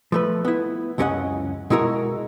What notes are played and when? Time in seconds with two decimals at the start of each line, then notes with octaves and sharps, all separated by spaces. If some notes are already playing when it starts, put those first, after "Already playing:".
0.12 F3 A3 B4
0.45 B3 E4
0.98 C#2 F#2 C#4 A#4 D#5 F#5
1.70 B2 G#3 E4 F#4 A#4